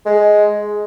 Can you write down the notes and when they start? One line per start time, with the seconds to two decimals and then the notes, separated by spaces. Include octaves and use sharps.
0.06 G#3